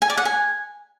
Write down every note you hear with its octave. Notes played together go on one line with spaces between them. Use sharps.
G#5
D5
F#5
G#5